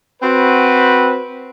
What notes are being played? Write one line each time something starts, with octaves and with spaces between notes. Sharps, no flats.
C4 F#4 B4